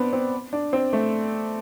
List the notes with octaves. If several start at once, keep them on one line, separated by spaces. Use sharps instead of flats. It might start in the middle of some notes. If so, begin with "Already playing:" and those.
Already playing: B3 C4 D4
C4
D4
C4
A3